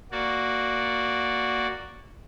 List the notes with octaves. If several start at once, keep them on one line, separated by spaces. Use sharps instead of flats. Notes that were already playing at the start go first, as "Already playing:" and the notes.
A#3 F#4 D5